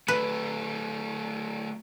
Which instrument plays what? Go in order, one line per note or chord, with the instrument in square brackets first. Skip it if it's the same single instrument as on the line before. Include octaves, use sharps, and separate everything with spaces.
[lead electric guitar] F#3 A3 [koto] B4